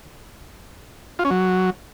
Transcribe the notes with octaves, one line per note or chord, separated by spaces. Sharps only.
F4
C#4
F#3